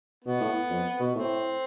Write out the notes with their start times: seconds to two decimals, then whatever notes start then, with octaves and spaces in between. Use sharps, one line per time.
0.24 B2 B3
0.40 A2
0.70 F2
1.00 B2
1.15 A2 C4